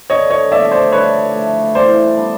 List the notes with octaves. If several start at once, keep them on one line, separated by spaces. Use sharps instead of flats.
D3 C#5 D#5
C#5 D#5
F3 A3 D5 E5
C5 D5
D3 B4 C#5
F3 A3
E3 C5 D5
G3 B3 D4